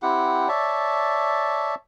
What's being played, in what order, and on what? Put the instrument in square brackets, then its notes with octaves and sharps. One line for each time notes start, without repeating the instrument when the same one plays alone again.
[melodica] C4 E4 G4 F#5
C#5 D5 E5 A5